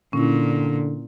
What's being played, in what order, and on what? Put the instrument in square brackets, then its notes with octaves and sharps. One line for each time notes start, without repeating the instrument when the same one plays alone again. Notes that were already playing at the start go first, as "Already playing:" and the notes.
[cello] A#2 [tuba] D3 [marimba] C#4 E4